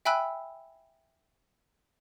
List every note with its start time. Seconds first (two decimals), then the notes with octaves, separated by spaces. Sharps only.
0.05 E5 G5 G#5 B5 E6 F#6